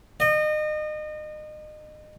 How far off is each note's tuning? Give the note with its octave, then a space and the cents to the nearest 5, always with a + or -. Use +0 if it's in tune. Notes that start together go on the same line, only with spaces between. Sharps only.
D#5 -30